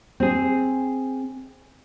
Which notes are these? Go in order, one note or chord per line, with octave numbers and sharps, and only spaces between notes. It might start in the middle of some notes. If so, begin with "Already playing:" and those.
C4 G#4